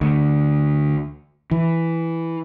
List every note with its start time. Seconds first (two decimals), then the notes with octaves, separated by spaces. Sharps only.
0.01 D2
1.51 E3